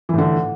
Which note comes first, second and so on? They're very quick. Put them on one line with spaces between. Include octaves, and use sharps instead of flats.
E3 A2 D3